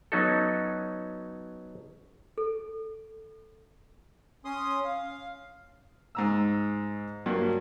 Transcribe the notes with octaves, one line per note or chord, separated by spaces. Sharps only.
F#3 B3 C#4 D#4 F#4 A4
A4
C#4 C6 D#6
F5
G#2 A#5 E6
G2 F#3 A#3